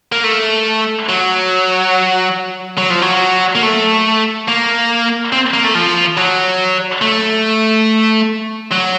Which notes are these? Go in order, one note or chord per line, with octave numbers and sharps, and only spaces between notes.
A#3
A3
F#3
F#3
F3
F#3
A#3
A3
A#3
C4
A#3
A3
F3
F#3
A3
F#3